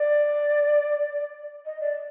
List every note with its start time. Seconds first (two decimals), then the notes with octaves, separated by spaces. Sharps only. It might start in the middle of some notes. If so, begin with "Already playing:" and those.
Already playing: D5
1.66 D#5
1.80 D5